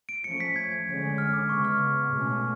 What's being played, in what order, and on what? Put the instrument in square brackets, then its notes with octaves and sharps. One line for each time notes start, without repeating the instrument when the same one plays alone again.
[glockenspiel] D7
[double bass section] F3 A3 C#4 [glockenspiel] C#7
[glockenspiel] B6
G#6
[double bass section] D3 G#3 C#4
[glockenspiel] F6
D6
[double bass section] C#3 G#3 B3 [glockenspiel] C#6
[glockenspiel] F6
[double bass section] B2 A3 C#4